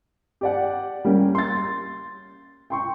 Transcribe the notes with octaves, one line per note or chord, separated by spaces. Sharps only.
G4 D5 F#5
G3 A#3 C#4
C6 A6
G5 C6 C#6